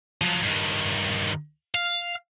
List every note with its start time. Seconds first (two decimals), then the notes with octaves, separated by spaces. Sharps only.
0.21 F3 F#3
0.42 G2 D#3
1.75 F5